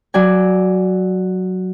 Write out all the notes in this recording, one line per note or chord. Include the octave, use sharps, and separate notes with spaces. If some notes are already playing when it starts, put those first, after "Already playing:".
F#3 D5 G#5